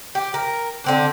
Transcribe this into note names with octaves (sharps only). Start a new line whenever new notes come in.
G4
A#4
D3 C4 D4